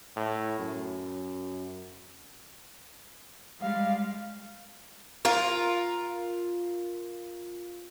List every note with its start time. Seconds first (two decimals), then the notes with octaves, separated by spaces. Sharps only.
0.17 A2
0.59 F#2
3.61 G3 G#3 F5
5.25 F4 A#4